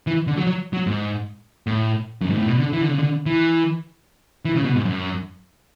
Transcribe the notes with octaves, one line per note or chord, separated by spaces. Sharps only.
E3
D3
F#3
F#3
F#3
G#2
A2
F#2
G#2
A2
B2
D3
E3
D3
C#3
D3
E3
E3
C#3
B2
G#2
F#2